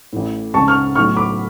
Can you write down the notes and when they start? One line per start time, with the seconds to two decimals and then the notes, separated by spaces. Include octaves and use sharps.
0.13 A1 A2
0.54 C#2 C#3 A5 C#6
0.68 C#6 F6
0.96 B1 A2 C#6 F6
1.16 B5 D6